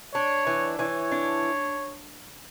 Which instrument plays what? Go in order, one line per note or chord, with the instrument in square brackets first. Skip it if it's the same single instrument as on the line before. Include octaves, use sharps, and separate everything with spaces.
[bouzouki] D4 [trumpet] C#5
[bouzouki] E3
[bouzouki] E3 [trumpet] C#5
[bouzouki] D4